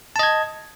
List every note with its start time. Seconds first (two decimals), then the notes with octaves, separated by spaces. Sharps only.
0.16 A5
0.19 D#5
0.23 G#6